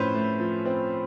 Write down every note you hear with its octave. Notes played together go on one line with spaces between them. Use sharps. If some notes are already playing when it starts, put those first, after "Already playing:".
Already playing: A2 F3 C4 C#4 B4 C5
A3
F3
C4